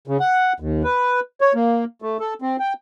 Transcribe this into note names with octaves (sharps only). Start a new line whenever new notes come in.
C#3
F#5
D#2
B4
C#5
A#3
A3
A4
C4
G5